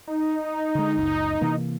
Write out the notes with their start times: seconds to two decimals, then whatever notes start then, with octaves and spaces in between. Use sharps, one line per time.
0.07 D#4
0.75 D3 G#3
0.96 F#1 C#2
1.41 C3 E3 A#3